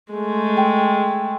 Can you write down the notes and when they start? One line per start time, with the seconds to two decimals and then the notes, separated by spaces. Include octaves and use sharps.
0.13 G#3 A3
0.57 G5